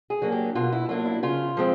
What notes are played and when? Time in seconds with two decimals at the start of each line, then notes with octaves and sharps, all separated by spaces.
0.10 G#4
0.22 F#3 A#3 D4
0.32 G4
0.55 B2 F4
0.72 E4
0.89 F#3 A#3 D4 F4
1.05 E4
1.23 C#3 F4
1.57 F3 G#3 C4